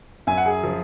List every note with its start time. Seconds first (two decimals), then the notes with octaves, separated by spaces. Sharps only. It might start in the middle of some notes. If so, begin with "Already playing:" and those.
0.27 F#2 G#5
0.37 F#5
0.46 G#4 G#5
0.63 F3